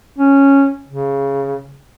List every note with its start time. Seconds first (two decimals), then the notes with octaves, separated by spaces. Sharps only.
0.18 C#4
0.88 C#3